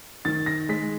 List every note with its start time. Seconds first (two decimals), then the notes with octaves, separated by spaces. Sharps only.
0.25 D#3 A6
0.46 A#6
0.69 G#3 B6